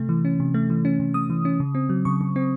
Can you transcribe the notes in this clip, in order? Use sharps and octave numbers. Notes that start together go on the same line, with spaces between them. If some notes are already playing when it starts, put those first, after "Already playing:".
Already playing: C3 A3
E3
C#4
C3
A3
E3
C#4
C3
A3 D#6
E3
C#4
C#3
C4
F#3
C#3 C#6
C#3
C4